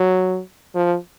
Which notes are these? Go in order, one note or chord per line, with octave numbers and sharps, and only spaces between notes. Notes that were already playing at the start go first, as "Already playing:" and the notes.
Already playing: F#3
F3